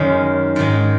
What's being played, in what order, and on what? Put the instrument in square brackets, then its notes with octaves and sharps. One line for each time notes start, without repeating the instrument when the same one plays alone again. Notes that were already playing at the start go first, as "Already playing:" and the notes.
Already playing: [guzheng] F#2 D#3 G#3 C#4
G#2 D#3 G#3